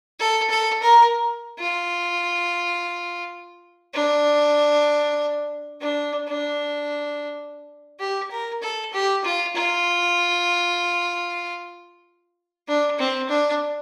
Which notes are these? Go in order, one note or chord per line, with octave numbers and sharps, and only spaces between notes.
A4
A4
A#4
F4
D4
D4
D4
G4
A#4
A4
G4
F4
F4
D4
C4
D4